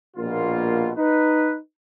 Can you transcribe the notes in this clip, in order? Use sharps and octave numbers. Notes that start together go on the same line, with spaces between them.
A#1 B2 A#3 F4
D#4 B4